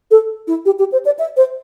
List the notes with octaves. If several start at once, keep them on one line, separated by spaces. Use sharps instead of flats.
A4
E4
G4
G4
C5
D5
E5
C5